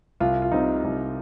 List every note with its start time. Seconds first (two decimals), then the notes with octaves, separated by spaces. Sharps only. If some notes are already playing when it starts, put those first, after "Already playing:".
0.20 C2 F4
0.42 F4
0.52 C3 G3 C4 D#4
0.84 C2